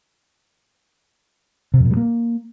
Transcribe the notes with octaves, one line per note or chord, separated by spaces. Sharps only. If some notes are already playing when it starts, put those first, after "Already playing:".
C3
F2
A#2
G3
A#3